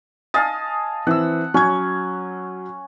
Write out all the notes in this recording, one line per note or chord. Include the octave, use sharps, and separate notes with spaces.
D#5 F5 G#5 A5 D#6 A6
E3 C4 F#5 E6
F#3 C#4 G#6